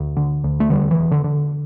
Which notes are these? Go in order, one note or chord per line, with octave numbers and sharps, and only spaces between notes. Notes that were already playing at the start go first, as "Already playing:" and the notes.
Already playing: D2
D3
D2
A3
E2 D3 G3
E3
E1
D3
D3